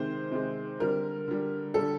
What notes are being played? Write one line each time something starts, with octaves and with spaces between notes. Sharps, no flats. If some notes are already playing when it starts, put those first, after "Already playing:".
Already playing: C3 D#3 G#3 C5
C3 D#3 G#3
D3 G3 A#4
D3 G3
D3 G3 A4